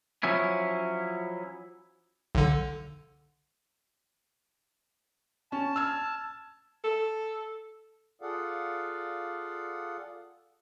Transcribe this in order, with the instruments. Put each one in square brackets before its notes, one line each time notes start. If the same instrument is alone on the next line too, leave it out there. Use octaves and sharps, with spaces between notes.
[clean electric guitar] F3 F#3 C#4 E4
[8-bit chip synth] B1 D3
[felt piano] C#4 [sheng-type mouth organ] A5
[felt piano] E6 F6 G#6
[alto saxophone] A4
[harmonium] F4 G#4 A4 D5 F5 F#5